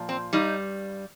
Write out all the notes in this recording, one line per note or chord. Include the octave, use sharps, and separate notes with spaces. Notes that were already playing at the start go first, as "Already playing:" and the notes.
Already playing: A#2 F3
C4
G2 G3 D#4